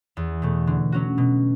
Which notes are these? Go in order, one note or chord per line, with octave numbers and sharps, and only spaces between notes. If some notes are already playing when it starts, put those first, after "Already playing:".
E2
B2 A3
D3
F#3 C#4 F#4
B2